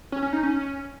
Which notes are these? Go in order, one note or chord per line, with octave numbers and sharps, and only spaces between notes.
C#4
C#4
D#4
C#4